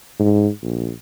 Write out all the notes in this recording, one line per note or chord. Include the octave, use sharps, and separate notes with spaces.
G#2
A#1